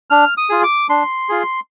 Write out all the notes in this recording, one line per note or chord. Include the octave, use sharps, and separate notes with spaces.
D4 F6
D#6
F4 G#4
D6
D4 C6
F4 G#4